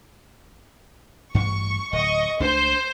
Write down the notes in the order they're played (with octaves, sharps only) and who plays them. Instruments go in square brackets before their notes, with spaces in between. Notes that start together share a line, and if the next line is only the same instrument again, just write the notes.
[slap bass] A1 G2 [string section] C#6
[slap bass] D1 [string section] D#5 C#6
[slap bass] C#2 A3 D4 [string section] C5